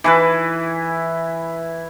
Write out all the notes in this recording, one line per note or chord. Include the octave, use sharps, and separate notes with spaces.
E3 E4 B4